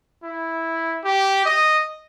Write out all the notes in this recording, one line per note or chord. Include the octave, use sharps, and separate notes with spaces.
E4
G4
D#5